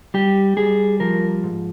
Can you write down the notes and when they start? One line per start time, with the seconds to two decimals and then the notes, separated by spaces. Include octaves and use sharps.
0.14 G3 G4
0.57 G3 G#4
1.00 F3 A#4
1.44 G#2